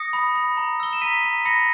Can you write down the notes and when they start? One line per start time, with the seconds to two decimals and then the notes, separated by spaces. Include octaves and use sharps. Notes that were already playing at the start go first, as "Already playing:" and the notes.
Already playing: D#6 A#6 C#7
0.13 B5
0.36 B5
0.57 A#5
0.80 E6 G7
0.93 E7
1.01 A#5 B6 D#7
1.23 A#5
1.45 B5 A#6 C#7